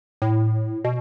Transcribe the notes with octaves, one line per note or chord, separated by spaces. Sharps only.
A2
B2